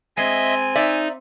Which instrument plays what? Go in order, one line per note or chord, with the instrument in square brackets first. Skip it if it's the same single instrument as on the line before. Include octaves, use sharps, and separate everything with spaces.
[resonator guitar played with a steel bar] G#3 [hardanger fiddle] C4 [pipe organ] D#5 E5 [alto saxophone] G#5
[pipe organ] D#4 [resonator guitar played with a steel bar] D5 E5